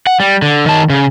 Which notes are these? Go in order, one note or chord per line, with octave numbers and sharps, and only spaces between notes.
F#5
G3
D3
D#3 A5
C#3